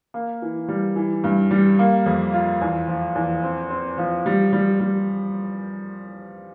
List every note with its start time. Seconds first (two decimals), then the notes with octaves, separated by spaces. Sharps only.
0.14 A#3
0.42 E3
0.68 G3
0.96 E3
1.24 G2
1.51 G3
1.79 A#3
2.06 F2
2.34 F4
2.61 E2
2.88 F3
3.15 E2
3.44 C4
3.70 C4
3.98 F3
4.26 G3
4.53 G3
4.80 G3